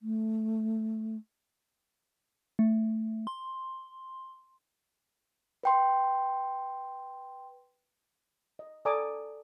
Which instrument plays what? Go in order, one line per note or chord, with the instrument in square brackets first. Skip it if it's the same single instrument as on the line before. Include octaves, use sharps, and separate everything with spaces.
[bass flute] A3
[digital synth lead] A3
C6
[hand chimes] B4 G5 C6
[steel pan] D#5
A4 D5 G#5 A#5 D6 D#6